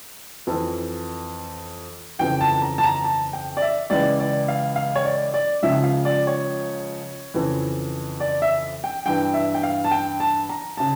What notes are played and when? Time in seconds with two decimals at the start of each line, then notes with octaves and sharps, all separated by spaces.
0.47 F2 E3
2.19 F2 C#3 E3 G5
2.41 A5
2.52 A5
2.62 A#5
2.78 A5
2.84 A#5
3.04 A5
3.33 G5
3.57 D5
3.62 E5
3.90 C#2 C#3 E3 D5
4.20 D5
4.48 F5
4.76 F5
4.96 C#5
5.05 D5
5.34 D5
5.63 C#2 C#3 F3 E5
5.83 F5
6.05 D5
6.27 C#5
7.34 F2 C#3 E3
8.20 D5
8.42 E5
8.84 G5
9.06 G2 E3 G5
9.34 E5
9.54 G5
9.63 F5
9.84 A5
9.91 G5
10.20 A5
10.49 A#5
10.77 C#3 A5